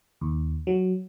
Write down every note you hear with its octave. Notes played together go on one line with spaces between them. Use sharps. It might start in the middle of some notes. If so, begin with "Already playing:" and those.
D#2
F#3